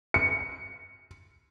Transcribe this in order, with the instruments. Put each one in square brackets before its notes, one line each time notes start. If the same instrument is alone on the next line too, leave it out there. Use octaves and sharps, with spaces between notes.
[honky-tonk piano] C#7